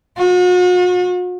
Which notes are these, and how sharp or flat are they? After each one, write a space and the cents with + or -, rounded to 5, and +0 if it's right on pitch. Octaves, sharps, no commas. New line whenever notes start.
F#4 -45